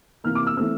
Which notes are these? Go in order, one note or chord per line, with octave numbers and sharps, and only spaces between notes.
C3 E3 A#3 F6
D6
E6
E3 A3 C4 E6